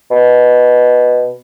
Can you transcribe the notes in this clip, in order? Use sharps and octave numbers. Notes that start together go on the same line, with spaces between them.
B2